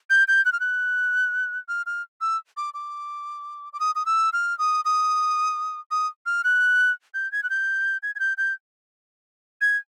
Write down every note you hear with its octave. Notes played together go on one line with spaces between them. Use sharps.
G6
G6
F#6
F6
F#6
F6
F6
E6
D6
D6
D6
D#6
D#6
E6
F6
D#6
D#6
D#6
F6
F#6
G6
G#6
F#6
G6
G#6
G#6
G6
G6
G#6